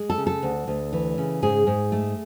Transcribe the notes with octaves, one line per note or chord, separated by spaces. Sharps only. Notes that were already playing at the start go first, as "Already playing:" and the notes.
Already playing: G#3
A4
C#3
A4
D2
D2
E3
C#3
G#2 G#4
G#2
A3